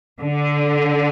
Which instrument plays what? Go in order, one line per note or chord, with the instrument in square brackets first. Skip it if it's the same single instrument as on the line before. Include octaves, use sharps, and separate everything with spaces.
[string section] D3